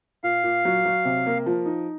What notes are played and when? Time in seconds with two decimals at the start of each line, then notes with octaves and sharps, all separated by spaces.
0.23 A#2 F5
0.44 A#2
0.65 F#3
0.86 F#3
1.05 C3
1.26 A#3
1.46 F3
1.66 D#4